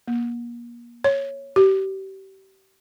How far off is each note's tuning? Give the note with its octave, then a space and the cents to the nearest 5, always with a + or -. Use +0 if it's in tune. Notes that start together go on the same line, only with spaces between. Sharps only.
A#3 +30
C#5 -10
G4 -30